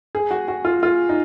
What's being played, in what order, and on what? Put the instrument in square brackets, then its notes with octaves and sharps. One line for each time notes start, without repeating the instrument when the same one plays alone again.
[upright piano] G#4
F#4
F#4
F4
F4
D#4